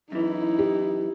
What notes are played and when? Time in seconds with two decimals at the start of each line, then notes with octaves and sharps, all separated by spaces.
0.12 F#2 E3 D#4 E4
0.59 G4